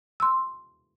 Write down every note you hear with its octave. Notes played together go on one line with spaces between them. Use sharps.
C6 E6